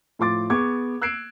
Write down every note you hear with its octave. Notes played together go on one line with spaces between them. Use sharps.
A2 F3 C6 D6 A6
B3 G#4 C#6 D6 G#6
E6 F#6 G#6 C7 D7 E7